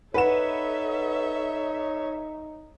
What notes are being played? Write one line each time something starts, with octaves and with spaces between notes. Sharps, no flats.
D#4 A4 B4 C#5 E5 F#5 E7